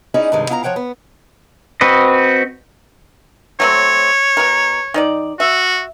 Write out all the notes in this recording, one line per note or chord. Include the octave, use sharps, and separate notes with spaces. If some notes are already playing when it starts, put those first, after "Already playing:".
C#4 D#4 E4 G#4 D5 D#5
G2 C3 D#3 G#3
B3 E4 F4 F5 G#5 A#5
F3 C#5 F#5 G5 A#5
B3
C4 F#4 B4 D#5
F#3 A3 C4 C#5
B2 A#4
D#3 D#4 D5
F#4 E5